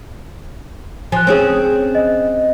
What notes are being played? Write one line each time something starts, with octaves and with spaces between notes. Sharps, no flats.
F3 G#5 F#6
C4 C#4 G#4
D#5